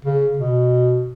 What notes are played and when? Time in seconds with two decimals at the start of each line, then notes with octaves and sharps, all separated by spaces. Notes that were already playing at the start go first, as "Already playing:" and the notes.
0.05 C#3
0.37 B2